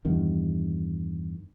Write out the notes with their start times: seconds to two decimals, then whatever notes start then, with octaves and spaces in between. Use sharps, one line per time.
0.05 E2 G2 D#3